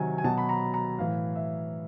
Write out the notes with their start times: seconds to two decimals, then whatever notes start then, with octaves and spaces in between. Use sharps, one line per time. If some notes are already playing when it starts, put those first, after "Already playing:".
Already playing: C3 D#3 F#3 G#5
0.18 G#5
0.24 B2 F#3 A5
0.38 B5
0.49 A#5
0.74 A#5
0.99 A2 E3 F5
1.36 E5